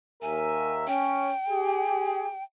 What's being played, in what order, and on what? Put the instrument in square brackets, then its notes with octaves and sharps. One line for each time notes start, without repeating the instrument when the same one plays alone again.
[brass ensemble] D#2 A#4 E5 [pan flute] G#5
[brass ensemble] C#4 [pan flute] G5
[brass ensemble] G4 G#4